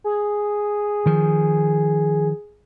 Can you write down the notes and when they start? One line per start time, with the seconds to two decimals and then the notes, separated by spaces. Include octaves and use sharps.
0.04 G#4
1.06 D#3 F3